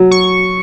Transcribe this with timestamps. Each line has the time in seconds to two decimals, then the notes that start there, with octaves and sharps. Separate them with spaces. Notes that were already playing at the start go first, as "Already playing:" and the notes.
Already playing: F#3
0.11 C#6